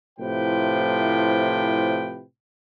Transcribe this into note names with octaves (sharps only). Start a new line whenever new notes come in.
A2 C3 F3 E4 B4 G5